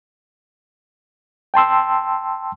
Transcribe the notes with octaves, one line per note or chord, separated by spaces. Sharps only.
G5 A5 C6 E6